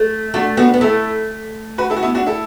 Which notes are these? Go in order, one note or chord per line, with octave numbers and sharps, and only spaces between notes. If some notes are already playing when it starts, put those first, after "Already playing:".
Already playing: A3
A3 D4 F#4
B3 D4 F#4
B3
A3 E4 A4
F#4 B4
E4 A4
F#4
B3 E4
D4 F#4
E4 A4